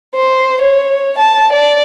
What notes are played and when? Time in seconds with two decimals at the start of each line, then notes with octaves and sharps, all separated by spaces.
0.15 C5
0.62 C#5
1.18 A5
1.52 D5